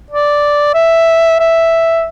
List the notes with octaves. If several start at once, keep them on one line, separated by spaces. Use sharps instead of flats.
D5
E5
E5